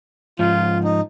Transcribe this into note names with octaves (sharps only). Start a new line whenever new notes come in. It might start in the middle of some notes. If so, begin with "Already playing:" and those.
G#2 F3 F4
D#4